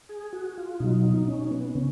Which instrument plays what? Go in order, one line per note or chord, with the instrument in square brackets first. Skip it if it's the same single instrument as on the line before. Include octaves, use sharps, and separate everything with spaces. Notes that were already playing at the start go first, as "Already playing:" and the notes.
[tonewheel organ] G#4
F#4
F4
B2 F#3 D#4
C#4
B3
C#3 C#4